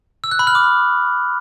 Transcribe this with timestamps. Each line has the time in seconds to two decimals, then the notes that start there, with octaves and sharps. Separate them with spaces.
0.24 E6
0.31 F#6
0.39 B5
0.47 F6
0.55 D6